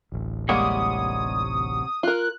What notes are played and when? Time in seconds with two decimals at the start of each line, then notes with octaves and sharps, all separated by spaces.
0.12 D1 A1
0.49 C3 G3 G#3 A#3 C#5 F#5 D#6
2.03 F4 A#4 F#6